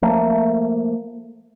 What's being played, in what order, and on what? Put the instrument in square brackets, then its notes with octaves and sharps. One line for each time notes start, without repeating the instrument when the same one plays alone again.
[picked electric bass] F3 A3 A#3